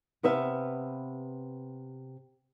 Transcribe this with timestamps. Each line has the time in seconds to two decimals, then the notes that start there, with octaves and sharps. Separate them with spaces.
0.23 C3 B3 B4 E5 F5